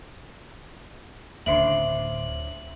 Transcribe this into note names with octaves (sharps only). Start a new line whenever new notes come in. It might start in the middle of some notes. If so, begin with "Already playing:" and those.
D1 C#3 D4 C5 E5 F#7